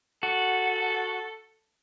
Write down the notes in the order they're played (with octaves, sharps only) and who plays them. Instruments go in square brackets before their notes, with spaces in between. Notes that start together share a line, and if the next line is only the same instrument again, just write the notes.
[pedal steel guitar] F#4 [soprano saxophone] A4